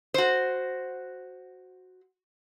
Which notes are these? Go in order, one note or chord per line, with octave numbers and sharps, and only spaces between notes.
F#4 C5